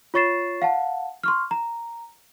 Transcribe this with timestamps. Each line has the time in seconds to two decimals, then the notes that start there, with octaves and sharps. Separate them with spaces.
0.14 F4 C#5 C#6 A6 C7 E7
0.62 F5 F#5 A5
1.23 C6 C#6 F6
1.51 A#5